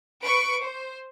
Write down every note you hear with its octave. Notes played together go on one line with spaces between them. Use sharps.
B4 C#6 D7
C5